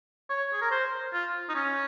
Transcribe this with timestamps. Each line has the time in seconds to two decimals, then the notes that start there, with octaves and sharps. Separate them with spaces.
0.30 C#5
0.53 G#4
0.62 A#4
0.71 C5
1.13 F4
1.49 D#4
1.55 C#4